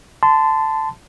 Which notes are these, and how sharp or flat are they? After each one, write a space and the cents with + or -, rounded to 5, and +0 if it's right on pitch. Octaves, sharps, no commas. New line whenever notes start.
A5 +0 C6 -30